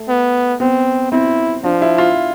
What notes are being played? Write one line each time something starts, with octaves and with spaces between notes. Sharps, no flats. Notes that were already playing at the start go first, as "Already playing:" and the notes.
Already playing: A3
B3
B3 C4
C4 E4
F3 D4
E4
F4